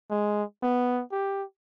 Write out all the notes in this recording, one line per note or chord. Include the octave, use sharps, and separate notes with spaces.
G#3
B3
G4